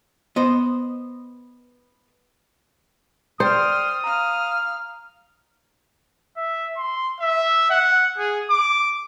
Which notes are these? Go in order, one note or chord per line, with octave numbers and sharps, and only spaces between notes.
B3 C5 D#5
C5 D5 G5 C6 D#6 F6
F5 A#5 F6
E5
C6
E5
F#5
G#4
D6